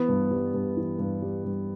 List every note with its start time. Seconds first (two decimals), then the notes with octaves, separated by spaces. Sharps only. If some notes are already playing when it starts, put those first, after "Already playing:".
Already playing: E3 B3
0.09 G2
0.31 G3
0.54 G2
0.77 E3
0.99 G2
1.22 G3
1.44 G2